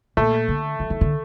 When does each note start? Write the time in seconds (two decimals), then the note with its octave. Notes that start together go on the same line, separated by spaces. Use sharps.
0.17 A#2 A3
0.48 D3
0.80 F3
0.90 D#3
1.01 D3